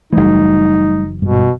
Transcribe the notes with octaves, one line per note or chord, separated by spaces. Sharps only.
F#1 E3 G3 A3 D#4
G#1 G2 B2